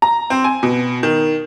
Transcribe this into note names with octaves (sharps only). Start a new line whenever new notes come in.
A#5
C4
G#5
B2
D#3